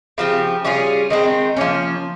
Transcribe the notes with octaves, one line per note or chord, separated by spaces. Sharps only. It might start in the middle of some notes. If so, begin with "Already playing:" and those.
C#3 F3 C4 G4
G3 C#4 F4 G#4
D#3 G#3 C4 D#4
F3 A#3 C#4